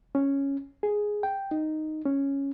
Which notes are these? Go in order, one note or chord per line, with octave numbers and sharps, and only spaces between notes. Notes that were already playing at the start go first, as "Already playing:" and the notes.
C#4
G#4
G5
D#4
C#4